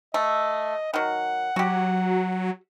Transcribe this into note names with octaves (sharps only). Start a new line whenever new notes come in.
A3 D#5
D#3 F#3 F#5
F#3 F#4 G4